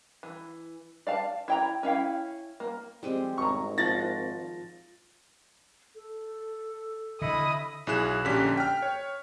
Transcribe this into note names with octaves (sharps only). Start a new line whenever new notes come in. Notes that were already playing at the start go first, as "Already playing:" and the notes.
E3
D5 F5 A5
E4 G5 A#5
C#4 E4 F5 G5
A#3
F2 G3 G#3 C4
G#1 A#5 C#6
F3 F4 F#5 A6 A#6
A4
D3 E4 D#5 B5 D#6
B1 E4 G#4 F#6 E7
A#1 D3 C#4 G4 B6
G5 F6
C#5